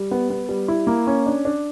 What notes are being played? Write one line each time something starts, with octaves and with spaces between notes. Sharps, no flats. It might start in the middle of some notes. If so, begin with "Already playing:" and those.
Already playing: G3
B3
B3
G3
E4
A#3
C#4
D4
D4